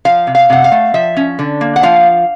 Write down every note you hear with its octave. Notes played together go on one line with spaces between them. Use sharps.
F3 F5
C3
F5
C3 F#5
F5
A3
F3 E5
C#4
D3
A#3
F#5
F3 F5